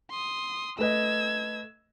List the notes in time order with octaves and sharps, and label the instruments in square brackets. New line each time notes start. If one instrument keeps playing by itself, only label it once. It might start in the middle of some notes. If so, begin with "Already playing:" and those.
[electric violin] C6 D#6
[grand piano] A3 B4 D#5 [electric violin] E6 G#6